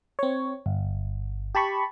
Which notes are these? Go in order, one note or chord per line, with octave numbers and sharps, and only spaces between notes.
C4 C#5
G1
G4 A5 B5 C#6